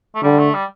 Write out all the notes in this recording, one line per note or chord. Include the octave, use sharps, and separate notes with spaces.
A3
D3 G3
A3
G3